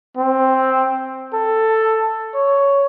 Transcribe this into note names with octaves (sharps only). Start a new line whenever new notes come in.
C4
A4
C#5